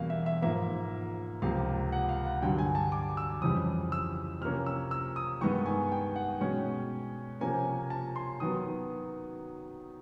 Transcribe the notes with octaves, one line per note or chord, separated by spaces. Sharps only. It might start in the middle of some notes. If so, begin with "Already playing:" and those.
Already playing: E2 B2 G3 A#3 C#4 F5
E5
E5
G#2 F3 A#3 E5
C#2 C3 F3 A#3 F5
F#5
F5
F#5
G2 D3 F#3 G5
G#5
A5
D6
E6
F2 C#3 E3 G3 D#6
E6
C3 F3 A#3 C#4 F6
E6
E6
D#6
G2 D#3 G#3 B3 C#6
G#5
G5
F#5
B2 G#3 C#4 G5
C3 F3 A#3 C#4 G#5
A5
C6
D#3 F#3 B3 D#6